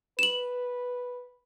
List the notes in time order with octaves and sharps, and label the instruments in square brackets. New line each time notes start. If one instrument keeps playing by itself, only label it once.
[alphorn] B4 [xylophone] E7 F#7